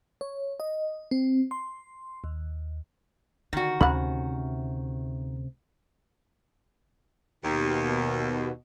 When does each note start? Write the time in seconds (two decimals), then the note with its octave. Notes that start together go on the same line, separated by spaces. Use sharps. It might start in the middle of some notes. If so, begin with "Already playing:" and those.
0.21 C#5
0.60 D#5
1.11 C4
1.51 C6
2.24 D#2
3.53 D3 D#3 F#4
3.81 D2 C3 C4 C#4 F#5 B5
7.44 D#2 B2